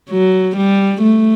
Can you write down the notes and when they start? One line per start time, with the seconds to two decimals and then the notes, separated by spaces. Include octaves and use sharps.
0.10 F#3
0.56 G3
1.02 A3